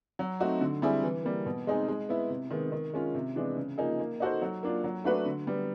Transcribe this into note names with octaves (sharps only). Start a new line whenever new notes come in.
F#3
A3 C4 D#4 F#4
D3
G3 C4 E4 G#4
E3
G3 A#3
B2
G#3 C4 D#4 G#4
G#3
B3 E4
C3
D#3 G#3 B3
D#3
G#3 C#4 F4
C3
E3 G#3 B3 D4
C#3
F3 A#3 D#4 G#4
A#3
D#4 F#4 A4 C5
F#3
A#3 D4 F4
F#3
A3 D4 F#4 B4
D3
G3 B3